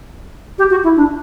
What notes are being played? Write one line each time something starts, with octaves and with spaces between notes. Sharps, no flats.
G4
F#4
E4
D4